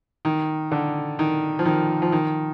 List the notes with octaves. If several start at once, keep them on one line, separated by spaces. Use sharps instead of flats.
D#3
D3
D#3
F3
D#3
F3
D#3